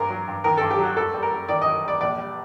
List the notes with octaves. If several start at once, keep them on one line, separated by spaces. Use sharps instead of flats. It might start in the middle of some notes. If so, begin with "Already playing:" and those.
Already playing: G2 C4 A#4
F#3
G2
D#3 A#4
G2 A4
G4
F#3
F#4
F#2 A4
G3
A#4
F#2
D#3 D5
F#2 D#5
G3 D5
A#1 D5
G3